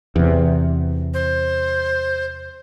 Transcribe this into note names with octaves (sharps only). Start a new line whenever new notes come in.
E2 C3
C5